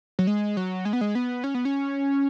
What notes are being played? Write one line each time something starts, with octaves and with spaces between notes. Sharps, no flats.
F#3
G#3
F#3
G#3
B3
G#3
B3
C#4
B3
C#4